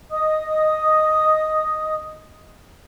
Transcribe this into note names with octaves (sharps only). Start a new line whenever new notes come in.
D#5 D#6